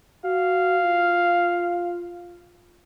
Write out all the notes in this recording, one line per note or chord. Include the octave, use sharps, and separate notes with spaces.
F#4 F5
F4